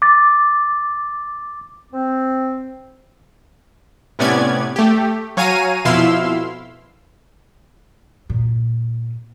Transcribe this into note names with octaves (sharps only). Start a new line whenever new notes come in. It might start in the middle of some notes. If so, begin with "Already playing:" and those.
D6 A6
C4
A2 C3 B3 C#4 D5 G#6
A3 G4
F#3 C#5 F5 G#5 A#5 D#7
F2 B2 E4 F5 C6 E6
A#2